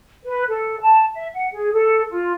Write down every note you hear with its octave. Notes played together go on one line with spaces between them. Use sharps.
B4
A4
A5
E5
F#5
G#4
A4
F4